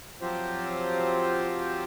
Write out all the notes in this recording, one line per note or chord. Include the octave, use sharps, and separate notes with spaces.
F3 F#3 C4 F4 G4 C5